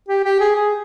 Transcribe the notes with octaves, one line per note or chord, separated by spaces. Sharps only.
G4
G4
G#4
G#4